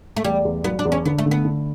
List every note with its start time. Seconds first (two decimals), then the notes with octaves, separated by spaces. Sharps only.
0.16 A3
0.24 E2 G3
0.45 E2
0.64 F#3 B3
0.79 D4
0.85 E2
0.92 C#4
1.05 D3 B3
1.18 A3
1.26 D3
1.31 B3
1.45 D3